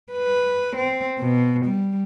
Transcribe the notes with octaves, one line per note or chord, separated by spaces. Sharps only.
B4
C4
B2
G3